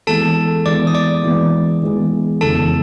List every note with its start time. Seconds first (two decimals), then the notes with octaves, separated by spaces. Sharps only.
0.07 E3 G#3 B3 A4 A5
0.65 E3 G#3 B3 D5 D6
0.87 D#6
0.94 D5 D6
1.24 E3 G#3 B3
1.82 E3 G#3 B3
2.41 F2 C#3 E3 G#3 B3 A4 A5